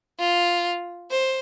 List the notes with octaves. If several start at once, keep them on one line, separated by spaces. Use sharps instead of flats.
F4
C5